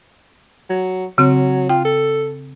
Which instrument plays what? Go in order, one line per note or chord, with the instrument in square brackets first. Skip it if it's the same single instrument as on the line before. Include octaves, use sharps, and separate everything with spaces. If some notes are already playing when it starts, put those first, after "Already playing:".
[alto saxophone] F#3
[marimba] C#3 C4 [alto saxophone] F#3
[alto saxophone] F4 [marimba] G5
[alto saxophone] A4